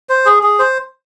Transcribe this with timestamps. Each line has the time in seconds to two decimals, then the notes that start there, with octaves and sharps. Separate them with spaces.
0.09 C5
0.25 G#4
0.43 G#4
0.59 C5